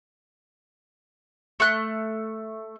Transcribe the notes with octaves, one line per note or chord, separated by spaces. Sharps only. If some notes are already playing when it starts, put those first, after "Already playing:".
A3 F#6